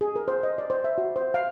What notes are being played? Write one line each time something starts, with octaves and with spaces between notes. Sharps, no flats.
G#4
A#4
C5
D#5
D5
C5
E5
F#4
C5
F5